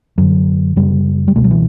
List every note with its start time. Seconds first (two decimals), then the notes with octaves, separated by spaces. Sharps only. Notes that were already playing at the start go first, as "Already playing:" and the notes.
0.18 F#2 D3 F#3
0.76 F#2 C#3 G3
1.28 G3
1.36 C#2 B2 A3
1.44 F#3
1.51 E3